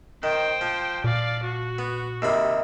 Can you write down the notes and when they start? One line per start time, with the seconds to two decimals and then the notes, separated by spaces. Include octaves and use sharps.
0.23 D#3 C5 G5
0.61 F3
1.04 A#2 D5 F5
1.43 F#4
1.79 B3
2.22 D#2 C3 B5